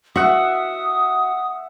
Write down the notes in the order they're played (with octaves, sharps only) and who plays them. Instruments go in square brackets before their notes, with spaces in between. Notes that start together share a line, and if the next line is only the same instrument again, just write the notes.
[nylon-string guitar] F#4 [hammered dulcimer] E5 F#5 [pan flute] D#6